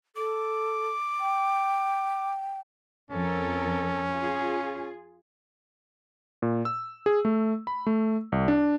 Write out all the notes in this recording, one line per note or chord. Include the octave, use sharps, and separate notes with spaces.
A4 D6
G5
F2 C#4 A4 A#4
F4 G#4
A#2
E6
G#4
A3
B5
A3
C2
D4